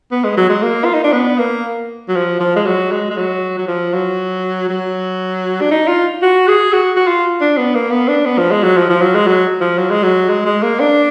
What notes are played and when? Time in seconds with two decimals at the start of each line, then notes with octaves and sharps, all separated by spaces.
0.12 B3
0.24 G#3
0.37 F#3
0.49 G#3
0.63 A#3
0.85 F4
0.94 D#4
1.04 D4
1.13 B3
1.39 A#3
2.09 F#3
2.16 F3
2.40 F3
2.56 G#3
2.66 F#3
2.92 G#3
3.10 G#3
3.17 F#3
3.58 F#3
3.68 F3
3.93 F#3
4.69 F#3
5.61 D4
5.71 D#4
5.88 F4
6.22 F#4
6.48 G#4
6.73 F#4
6.96 F#4
7.07 F4
7.41 D4
7.58 B3
7.75 A#3
7.91 B3
8.09 D4
8.26 B3
8.38 F3
8.51 G#3
8.64 F#3
8.77 F3
8.89 F3
9.01 F#3
9.15 G#3
9.27 F#3
9.61 F3
9.78 F#3
9.91 G#3
10.04 F#3
10.29 G#3
10.45 G#3
10.63 A#3
10.80 D4